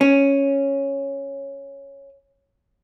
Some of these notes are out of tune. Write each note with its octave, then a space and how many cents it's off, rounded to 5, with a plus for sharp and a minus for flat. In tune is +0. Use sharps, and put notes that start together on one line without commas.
C#4 -5